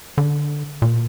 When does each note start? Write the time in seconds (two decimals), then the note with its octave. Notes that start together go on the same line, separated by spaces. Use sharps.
0.18 D3
0.82 A#2